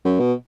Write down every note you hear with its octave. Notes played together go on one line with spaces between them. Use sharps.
F#2
B2